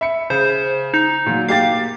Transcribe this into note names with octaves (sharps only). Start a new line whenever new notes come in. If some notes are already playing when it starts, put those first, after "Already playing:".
E5 B5 C#7
C#3 C5
D#4
A#2 F#3
A#3 G4 F5 A6